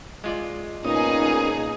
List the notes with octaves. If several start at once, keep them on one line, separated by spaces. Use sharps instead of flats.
G#3 F4 D5
A#2 B3 C#4 D#4 G#4 D#6